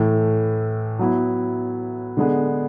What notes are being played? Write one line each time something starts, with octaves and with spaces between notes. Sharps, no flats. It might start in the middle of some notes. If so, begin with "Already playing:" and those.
Already playing: A2 E3 A3
F#3 B3 E4
D3 G#3 B3